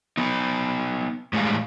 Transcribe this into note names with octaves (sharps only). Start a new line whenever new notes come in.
B3 D#4
A2 G3 G#3 F5